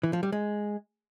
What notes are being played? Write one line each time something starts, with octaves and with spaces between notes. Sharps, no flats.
E3
F3
G3
G#3